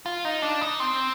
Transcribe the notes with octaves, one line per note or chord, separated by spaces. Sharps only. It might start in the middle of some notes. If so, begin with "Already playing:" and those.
F4
D#4
D4
D#4
C4